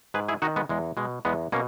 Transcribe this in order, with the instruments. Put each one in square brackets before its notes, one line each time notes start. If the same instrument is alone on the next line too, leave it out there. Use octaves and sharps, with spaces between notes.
[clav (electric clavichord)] G#2 G#4 B4
E4 G#4
D#3 D#4 F#4
G#3 B3
E2 G#3
B2 G#3
E2 G#3 B3
B2 A#3 C#4